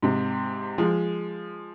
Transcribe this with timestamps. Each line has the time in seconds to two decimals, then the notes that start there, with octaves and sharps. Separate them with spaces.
0.03 G#2 C3
0.78 F3 G#3